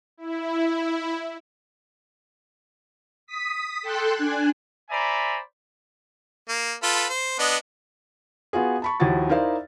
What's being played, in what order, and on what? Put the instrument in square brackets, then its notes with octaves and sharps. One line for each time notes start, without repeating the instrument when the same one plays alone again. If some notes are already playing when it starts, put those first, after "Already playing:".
[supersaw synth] E4
[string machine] D#6 B6
A4 G5 C6 F#6
D4 G#5 F#6
[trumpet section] C5 D5 E5 G#5 A#5 B5
[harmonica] A#3
F4 A4 B4
C5
B3 D4 D#5
[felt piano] B3 F4 F#4 G#4
A5 B5 C#6
D#2 F3 E4 F#4 A6
D#4 E4 A#4 C5 D5 F5